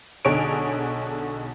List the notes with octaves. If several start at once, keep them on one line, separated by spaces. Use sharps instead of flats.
B1 D3 D#4 G#4 C#5 D7